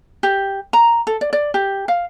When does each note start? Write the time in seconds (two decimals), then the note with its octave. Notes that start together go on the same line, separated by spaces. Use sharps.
0.23 G4
0.73 A#5
1.07 A4
1.21 D5
1.33 D5
1.54 G4
1.88 F5